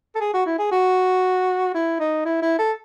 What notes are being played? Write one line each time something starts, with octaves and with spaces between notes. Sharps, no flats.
A4
G#4
F#4
E4
G#4
F#4
E4
D#4
E4
E4
A4